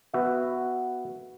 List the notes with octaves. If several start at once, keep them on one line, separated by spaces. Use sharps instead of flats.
B3 F#4 E5